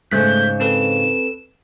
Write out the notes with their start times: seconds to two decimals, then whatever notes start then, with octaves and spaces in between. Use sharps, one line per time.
0.11 G#2 C#3 A3 F#6 G6 B6
0.60 C4 A4 B4 E7